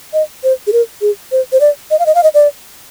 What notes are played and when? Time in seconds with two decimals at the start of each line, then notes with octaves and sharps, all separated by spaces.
0.13 D#5
0.44 C5
0.67 G#4
0.73 A#4
1.02 G#4
1.32 C5
1.52 C5
1.61 D5
1.91 D#5
1.99 F5
2.06 D#5
2.15 F5
2.23 D#5
2.34 D5